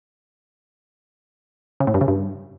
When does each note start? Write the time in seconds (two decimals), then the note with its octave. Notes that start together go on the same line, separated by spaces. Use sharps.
1.80 C#3
1.87 A2
1.94 G2
2.01 C#3
2.08 G2